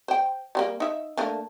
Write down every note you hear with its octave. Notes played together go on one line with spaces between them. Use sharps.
C5 G5
G3 G#3 A#3
D#4 E5
A3 A#3 D4